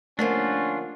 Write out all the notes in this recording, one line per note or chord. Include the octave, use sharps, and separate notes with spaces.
D3 F3 A3 A#3 C#4 D4 F4